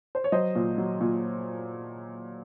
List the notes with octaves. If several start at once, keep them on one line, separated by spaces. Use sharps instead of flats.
C5
C#5
F#3 C5 D#5
A#2
F#3
A#2